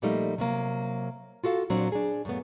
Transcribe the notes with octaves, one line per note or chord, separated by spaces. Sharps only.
A#2 F3 G3 A3 A#3 D#4
C3 F#3 A#3
F4 F#4 A4 F5
A#2 F#3 C4 D4
D4 G#4
F#2 A#2 A3 B3